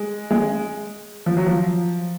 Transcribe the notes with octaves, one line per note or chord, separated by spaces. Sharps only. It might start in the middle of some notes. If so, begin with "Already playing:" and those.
Already playing: G#3
G#3
F3
F#3
F3